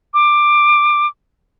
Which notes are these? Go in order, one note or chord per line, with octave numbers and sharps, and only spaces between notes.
D6